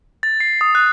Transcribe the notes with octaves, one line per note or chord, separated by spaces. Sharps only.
A6
C7
D#6
F#6